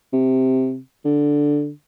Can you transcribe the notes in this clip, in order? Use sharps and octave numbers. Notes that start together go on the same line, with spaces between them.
C3
D3